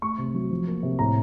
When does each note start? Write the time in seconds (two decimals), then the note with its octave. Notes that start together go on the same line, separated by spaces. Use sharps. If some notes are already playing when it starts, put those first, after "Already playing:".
0.02 A3 C#6
0.18 C3
0.34 F#3
0.51 F3
0.67 A#3
0.83 C3
0.99 A2 A#5